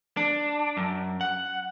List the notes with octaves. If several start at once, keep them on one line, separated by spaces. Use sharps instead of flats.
D4
F#2
F#5